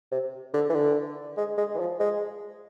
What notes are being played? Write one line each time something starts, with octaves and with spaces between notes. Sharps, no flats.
C3
D3
E3
D3
G#3
G#3
E3
F3
G#3